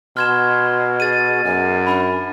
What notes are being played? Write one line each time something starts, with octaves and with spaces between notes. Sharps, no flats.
B2 C6 F6 G#6 E7
G#4 A6 D#7
F#2 G#5
D4 B5